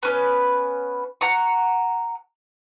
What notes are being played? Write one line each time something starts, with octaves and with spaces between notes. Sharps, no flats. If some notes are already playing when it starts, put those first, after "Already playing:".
B3 C#4 B4
F#5 A#5 C#6